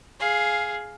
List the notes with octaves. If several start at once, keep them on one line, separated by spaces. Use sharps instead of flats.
G#4 F5